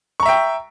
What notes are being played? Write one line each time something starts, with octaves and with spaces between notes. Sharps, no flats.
E5 G5 A#5 C#6